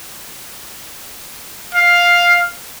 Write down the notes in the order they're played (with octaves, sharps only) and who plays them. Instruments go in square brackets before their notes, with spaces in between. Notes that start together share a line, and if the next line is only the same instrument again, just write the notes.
[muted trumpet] F5